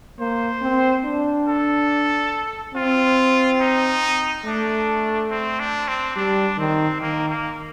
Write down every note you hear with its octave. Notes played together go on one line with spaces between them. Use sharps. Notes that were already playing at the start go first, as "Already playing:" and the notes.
A#3 C5
C4
D4
A4
C4 F4
D#4
A3 D4
C4
D4
C4
G3 D4
D#3 C4
D#3 A#3
A#3